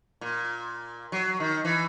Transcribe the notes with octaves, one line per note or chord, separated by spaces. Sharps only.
A#2
F#3
D#3
E3